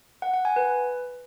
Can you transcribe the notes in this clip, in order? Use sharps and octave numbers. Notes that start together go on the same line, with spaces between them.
F#5
F#5
G#5
B4